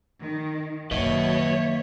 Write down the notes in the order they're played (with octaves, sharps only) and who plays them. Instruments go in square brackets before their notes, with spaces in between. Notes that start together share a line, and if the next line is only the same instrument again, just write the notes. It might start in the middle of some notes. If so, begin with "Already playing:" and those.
[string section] D#3
[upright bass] F#2 D#3 [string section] F#3 C#5 [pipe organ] A#3 E5 [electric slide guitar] B4 D#5